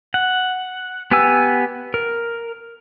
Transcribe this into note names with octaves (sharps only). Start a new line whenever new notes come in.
F#5
B3 G4 B4 G#5 E6
A#4